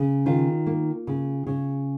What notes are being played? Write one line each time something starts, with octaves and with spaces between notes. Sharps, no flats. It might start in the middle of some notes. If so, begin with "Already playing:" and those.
Already playing: C#3
D#3 F4
A#3
C#3
C#3